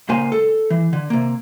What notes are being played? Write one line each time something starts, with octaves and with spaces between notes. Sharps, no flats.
C#2 A#2 A#3 C5 G#5
A4
E3
D3
C3 A#3